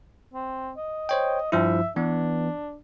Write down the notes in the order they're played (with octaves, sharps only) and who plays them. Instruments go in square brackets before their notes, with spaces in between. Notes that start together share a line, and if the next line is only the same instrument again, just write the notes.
[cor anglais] C4
D#5
[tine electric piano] C5 C#5 G5
[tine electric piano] G2 F3 E4 [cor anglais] E5
[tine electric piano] E3 B3 [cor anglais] D4